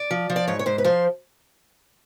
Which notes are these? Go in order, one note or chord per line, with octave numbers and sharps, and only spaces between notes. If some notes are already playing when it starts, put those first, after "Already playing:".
Already playing: D5
F3
F3
D5
G#2 C#5
C#5
G#2 C5
B4
F3 C5